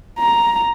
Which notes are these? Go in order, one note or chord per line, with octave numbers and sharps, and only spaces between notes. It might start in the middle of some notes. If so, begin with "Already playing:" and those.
A#5